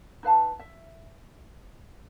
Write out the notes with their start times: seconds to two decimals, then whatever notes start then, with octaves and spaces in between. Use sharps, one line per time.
0.23 D#4 B4 F5 A5
0.59 E5